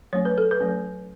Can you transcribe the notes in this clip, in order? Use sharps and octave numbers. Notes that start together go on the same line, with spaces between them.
F#3 A3 C#4 C#5
B4
A4
B4
F#3 A3 C#4